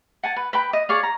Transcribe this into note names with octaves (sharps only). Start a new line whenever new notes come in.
F#5 G#5 A5
B4
B4 G5 B5
D#5
G#4 C#5 D5 F5
A#5